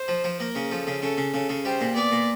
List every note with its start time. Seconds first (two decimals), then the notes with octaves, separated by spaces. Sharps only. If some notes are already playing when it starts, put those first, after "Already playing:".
Already playing: C5
0.08 F3
0.24 F3
0.40 A#3 A#4
0.55 C#3
0.71 F3 A4
0.87 C#3
1.02 C#3 A4
1.17 C#3
1.34 C#3 A4
1.49 C#3
1.65 G3 C5
1.81 A#2
1.96 B3 D5
2.12 A#2